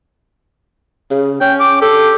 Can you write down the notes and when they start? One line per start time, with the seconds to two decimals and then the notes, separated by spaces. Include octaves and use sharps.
1.11 C#3
1.41 C#4 G5
1.60 D6
1.82 G4 A4